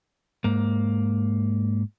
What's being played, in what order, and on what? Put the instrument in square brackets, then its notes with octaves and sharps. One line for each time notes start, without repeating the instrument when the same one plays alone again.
[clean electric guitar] G#2 A#3